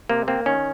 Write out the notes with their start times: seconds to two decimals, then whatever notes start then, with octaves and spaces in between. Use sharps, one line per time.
0.09 C3 A#3
0.28 A#3 C4
0.46 D#3 C#4